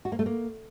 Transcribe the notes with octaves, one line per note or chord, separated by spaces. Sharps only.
F#4
A#3
A3
A#3